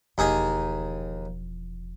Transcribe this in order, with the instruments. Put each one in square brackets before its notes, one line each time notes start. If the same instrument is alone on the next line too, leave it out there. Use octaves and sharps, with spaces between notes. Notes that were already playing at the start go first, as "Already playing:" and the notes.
[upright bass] E1 F3 [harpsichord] D#2 D#4 G#4